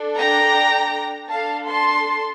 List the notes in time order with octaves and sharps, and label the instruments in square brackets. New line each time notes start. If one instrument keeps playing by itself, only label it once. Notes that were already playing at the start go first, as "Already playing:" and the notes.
Already playing: [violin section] D4 A4
G5 A#5
D4 A4 F5 A5
A5 C6